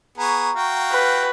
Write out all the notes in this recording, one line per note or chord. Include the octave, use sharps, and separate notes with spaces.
B3 G#4 A#5 C#6
F#4 F5 G5
B4